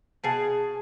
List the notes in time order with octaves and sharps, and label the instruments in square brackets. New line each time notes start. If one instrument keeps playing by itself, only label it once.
[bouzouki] B2 G#4 A5